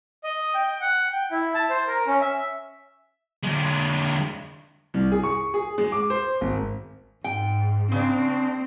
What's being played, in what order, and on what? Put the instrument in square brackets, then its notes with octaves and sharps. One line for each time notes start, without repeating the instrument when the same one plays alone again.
[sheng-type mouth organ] D#5
G5
F#5
G5
E4
A5
C5
A#4
C#4
E5
[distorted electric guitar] D3 G#3
[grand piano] C2
G#4
C#6
G#4
G#3
D6
C5
G#1
[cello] G#2 [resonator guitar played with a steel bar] G5
[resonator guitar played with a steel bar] C#3 D4 [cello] C4